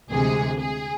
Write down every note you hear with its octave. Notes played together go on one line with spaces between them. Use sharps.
D2 C3 E3 G#3 G#4
G#4